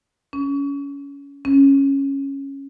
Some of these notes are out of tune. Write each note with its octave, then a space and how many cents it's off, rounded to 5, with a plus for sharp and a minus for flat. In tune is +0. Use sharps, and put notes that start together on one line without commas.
C#4 +25
C#4 -10